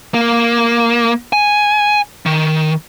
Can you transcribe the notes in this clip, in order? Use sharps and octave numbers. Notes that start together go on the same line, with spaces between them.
A#3
G#5
D#3